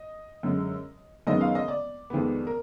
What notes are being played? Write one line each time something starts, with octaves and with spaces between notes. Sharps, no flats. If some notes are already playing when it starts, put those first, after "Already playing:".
Already playing: D#5
F#2 D3 G#3
F#2 D#3 G#3 B3 D#5
F5
D#5
D5
F2 D#3 G#3 B3
A#4